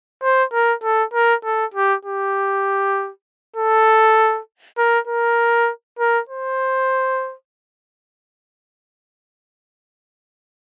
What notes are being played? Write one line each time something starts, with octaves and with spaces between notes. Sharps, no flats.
C5
A#4
A4
A#4
A4
G4
G4
A4
A#4
A#4
A#4
C5